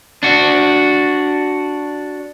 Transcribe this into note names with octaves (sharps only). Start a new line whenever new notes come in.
D4 F#4